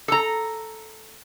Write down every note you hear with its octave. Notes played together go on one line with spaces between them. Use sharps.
A4 A#5